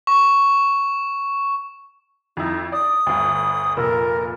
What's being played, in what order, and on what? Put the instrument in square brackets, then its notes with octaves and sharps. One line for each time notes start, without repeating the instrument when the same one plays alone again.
[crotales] C#6
[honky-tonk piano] F2 E4 [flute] D#4
[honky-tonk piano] D5 [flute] D#6
[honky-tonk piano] G1 D2
[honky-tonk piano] F1 A#2 E6 [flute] A#4